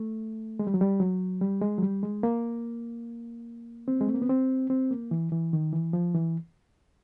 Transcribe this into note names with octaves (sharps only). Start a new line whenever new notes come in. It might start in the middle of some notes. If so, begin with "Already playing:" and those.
Already playing: A3
G#3
G3
F#3
G3
F#3
G3
G#3
F#3
G3
G#3
A#3
C4
G#3
A3
A#3
B3
C4
C4
A#3
E3
E3
D#3
E3
F3
E3